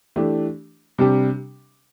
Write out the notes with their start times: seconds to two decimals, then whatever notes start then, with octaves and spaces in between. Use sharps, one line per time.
0.16 E3 A3 D4 G4
0.98 C3 G3 D4 G4